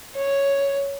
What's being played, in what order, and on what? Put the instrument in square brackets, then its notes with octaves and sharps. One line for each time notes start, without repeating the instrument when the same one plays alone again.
[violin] C#5